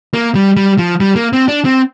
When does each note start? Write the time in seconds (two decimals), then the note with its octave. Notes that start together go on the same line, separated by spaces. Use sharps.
0.14 A#3
0.35 G3
0.57 G3
0.78 F3
1.00 G3
1.16 A#3
1.33 C4
1.48 D4
1.65 C4